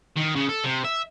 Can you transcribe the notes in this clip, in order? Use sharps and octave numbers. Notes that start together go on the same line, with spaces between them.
D#3
C#3
A4
C3
E5